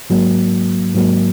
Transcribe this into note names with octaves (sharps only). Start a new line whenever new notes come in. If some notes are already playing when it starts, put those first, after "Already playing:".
G#2 F#3 A#3
G#2 F#3 A#3